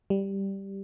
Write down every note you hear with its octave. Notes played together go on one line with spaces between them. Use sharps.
G3